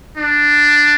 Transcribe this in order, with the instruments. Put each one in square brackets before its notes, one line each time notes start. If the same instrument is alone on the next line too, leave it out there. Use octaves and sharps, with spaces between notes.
[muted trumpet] D4